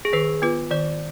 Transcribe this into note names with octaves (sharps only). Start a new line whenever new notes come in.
G#4
D#3 B4
B3 F4 B4
D#3 D5